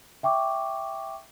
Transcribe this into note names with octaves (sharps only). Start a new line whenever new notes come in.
E5 G5 C#6 D6